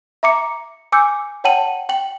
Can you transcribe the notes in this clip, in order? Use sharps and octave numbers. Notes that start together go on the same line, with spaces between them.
E5 A#5 D6 C#7
G#5 D6 E6 G6 C#7
C#5 F#5 G5 A5 D#7 F#7
G5 F#7